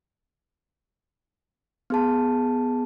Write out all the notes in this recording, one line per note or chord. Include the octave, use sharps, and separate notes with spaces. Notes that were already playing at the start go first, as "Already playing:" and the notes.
B3 G#4 A5